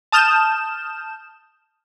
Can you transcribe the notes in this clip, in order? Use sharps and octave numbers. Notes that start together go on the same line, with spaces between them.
A5 D#6 F6 G6 E7